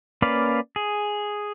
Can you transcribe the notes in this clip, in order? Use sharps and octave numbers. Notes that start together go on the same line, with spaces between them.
A#3 C#4 B4 D5 F5
G#4